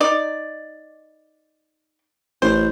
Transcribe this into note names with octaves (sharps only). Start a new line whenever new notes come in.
D#4 D5
A1 C5